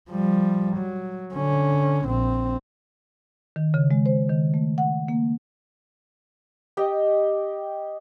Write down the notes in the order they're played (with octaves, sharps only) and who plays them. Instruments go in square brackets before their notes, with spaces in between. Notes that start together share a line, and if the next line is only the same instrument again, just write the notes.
[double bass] F3 G3
F#3
D3 C#4
A#1 C4
[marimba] D#3
C#3
G#3
C5
D#3
A3
F#5
A#3
[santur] G4 D#5